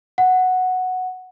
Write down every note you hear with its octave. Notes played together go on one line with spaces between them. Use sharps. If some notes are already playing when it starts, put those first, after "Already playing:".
F#5